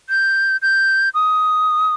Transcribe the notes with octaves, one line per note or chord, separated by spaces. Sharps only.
G6
G6
D#6